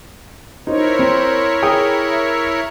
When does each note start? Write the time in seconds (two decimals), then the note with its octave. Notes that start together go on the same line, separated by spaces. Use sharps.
0.67 D#4 E4 A#4 C5 C#5
0.99 C4
1.63 G#4 G5 D#6
2.11 E5